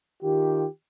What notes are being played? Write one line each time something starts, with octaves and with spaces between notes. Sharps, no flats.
D#3 F4 G4